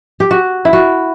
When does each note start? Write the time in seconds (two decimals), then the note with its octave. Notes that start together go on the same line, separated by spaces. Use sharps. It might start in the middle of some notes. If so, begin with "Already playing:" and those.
0.20 G4
0.31 F#4
0.65 E4
0.73 F#4